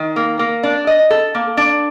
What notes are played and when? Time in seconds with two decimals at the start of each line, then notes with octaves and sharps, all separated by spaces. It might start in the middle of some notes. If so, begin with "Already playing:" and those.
Already playing: D#3
0.16 A#3
0.39 A#3
0.63 D4
0.87 D#5
1.10 A4
1.35 A#3
1.57 D4